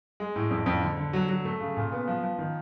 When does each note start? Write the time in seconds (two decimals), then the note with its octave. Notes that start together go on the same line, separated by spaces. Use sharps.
0.20 G#3
0.36 A2
0.51 F2
0.66 F2
0.82 D3
0.97 D3
1.13 F#3
1.29 F#3
1.45 A3
1.60 C#3
1.77 A#2
1.92 B3
2.08 F3
2.23 F3
2.38 D#3